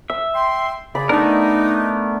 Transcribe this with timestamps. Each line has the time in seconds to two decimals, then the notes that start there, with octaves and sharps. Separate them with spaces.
0.10 E5 E6
0.34 G5 C6
0.95 C#3 G#4 D5 B5
1.09 A3 B3 D4 D#4 A#4